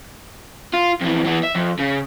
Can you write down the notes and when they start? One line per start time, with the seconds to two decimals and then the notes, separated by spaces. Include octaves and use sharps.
0.73 F4
1.01 F2 E3
1.25 E3 B3
1.43 E5
1.55 F2
1.79 C#3